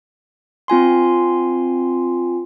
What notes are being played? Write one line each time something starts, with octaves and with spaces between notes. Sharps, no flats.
C4 F4 G#5 C6